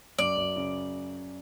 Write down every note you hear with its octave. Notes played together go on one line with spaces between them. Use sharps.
F#2 D5
F#2
C#3